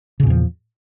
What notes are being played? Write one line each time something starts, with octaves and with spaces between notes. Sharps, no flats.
E2 A#2 C#3 F3